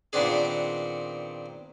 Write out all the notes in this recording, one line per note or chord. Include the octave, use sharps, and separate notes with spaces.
A#2 D#3 B3 C4 D4 G#4